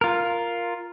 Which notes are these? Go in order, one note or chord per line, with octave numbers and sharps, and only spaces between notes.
F4 A#4